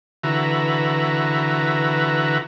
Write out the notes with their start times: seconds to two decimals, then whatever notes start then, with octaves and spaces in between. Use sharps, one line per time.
0.23 D3 E3 F#4 B4 E5 A#5